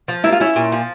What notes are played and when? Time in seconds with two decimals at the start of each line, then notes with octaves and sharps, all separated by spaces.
0.08 F3
0.24 A#3 E4
0.32 F4
0.40 C#4 E4
0.56 A#2
0.72 F3